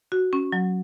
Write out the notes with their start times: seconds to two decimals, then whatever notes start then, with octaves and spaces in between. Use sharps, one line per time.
0.12 F#4
0.33 C#4
0.52 F#3